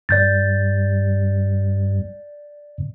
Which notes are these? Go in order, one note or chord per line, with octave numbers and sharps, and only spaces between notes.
G2 D5 G6 A6